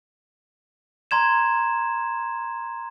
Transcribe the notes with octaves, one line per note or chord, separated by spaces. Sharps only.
A#5 C6 G#6 E7